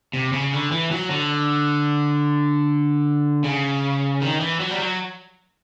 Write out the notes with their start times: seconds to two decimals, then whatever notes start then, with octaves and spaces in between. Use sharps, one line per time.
0.14 C3
0.32 C#3
0.53 D3
0.72 E3
0.91 F#3
1.10 D3
3.44 C#3
4.22 D#3
4.40 E3
4.60 F#3
4.70 G3
4.79 F#3